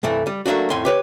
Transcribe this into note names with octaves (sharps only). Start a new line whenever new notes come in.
C2 G2 E3 A3
G3
F#3 A3 A#3 D4 F#4
F2 A2 G#5 C6
G4 B4 C#5